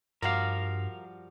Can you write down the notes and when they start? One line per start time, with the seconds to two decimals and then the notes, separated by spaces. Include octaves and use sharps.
0.22 G2 F3 G3 F#4 A#4 F5